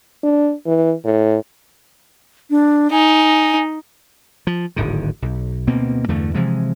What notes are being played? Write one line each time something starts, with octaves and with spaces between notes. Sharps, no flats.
D4
E3
A2
D4
D#4 G#5
F3
D1 G#1 D3 D#3
B1
D2 B2 A#3 C4
E2 G2 D3 A3
C3 E3 F3 G#3